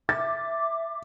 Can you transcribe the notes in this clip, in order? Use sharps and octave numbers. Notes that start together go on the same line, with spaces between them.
E5 D6 A6